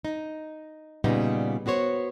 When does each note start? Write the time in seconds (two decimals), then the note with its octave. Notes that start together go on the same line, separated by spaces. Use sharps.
0.05 D#4
1.04 A#2 C#3 G3 B3 D#4
1.66 B3 F#4 C5 C#5